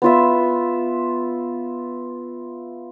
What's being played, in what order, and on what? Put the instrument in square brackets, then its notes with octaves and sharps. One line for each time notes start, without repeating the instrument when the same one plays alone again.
[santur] B3 F4 E5